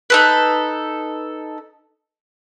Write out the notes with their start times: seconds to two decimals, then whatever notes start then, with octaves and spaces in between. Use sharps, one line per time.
0.10 D#4 A4 B4